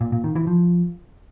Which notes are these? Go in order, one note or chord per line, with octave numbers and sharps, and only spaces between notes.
A#2
A#2
D#3
E3
F3